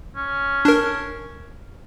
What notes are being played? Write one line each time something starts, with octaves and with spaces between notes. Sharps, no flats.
C#4
D4 A#4